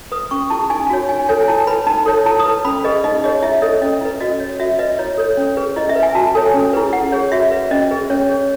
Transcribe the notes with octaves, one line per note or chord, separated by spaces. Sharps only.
B4 D#6
C#4 C#6
E4 G#4 A5
D#4 G#5
F#4 C#5
D#4 G#5
A4 C#5 G#5
G#5
E4 A5
B4 B5
D#4 A5
A4 C#5
E4 A5
D#6
B4
C#4 B5
G#4 B4 D#5
D#4 D#5
G#4 C#5 D#5
E4 E5
A4 C#5 D#5
C#4 D#5
E4 B4
F#4 D#5
C#5
F#4 E5
B4 D#5
E4 C#5
A4 C#5
C#4
G#4 B4
E4 D#5
E5
B4
G#5
F#4 A5
A4 C#5 G#5
C#4
E4 G#4 B4
E4 F#5
G#4 C#5
F#4 E5
B4
C#4 D#5
G#4 B4
C#4 C#5
G#4 C#5